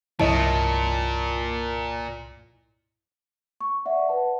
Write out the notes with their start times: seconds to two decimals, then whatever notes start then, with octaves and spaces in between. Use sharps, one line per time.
0.20 C2 G2 A#2 F3 E4 C#5 D#5 A5
3.61 C#6
3.85 D5 E5 F#5
4.09 B4 F#5 A5